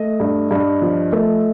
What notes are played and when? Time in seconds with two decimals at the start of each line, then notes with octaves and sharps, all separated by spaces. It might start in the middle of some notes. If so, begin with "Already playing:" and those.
Already playing: A3 D#5
0.20 G2
0.51 G2
0.82 F3
1.12 A3